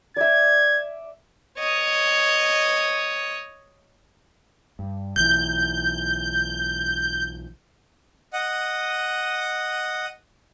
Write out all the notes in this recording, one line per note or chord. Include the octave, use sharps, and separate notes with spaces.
D5 E5 G#6
C#5 D#5
G2
B1 E3 G6
D#5 F#5